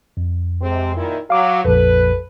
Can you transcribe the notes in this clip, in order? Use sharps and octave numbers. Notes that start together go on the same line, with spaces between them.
F2
C3 G#3 C4
A#2 D#3 E4
F#3 F5 D6
A#1 F2 A4 B4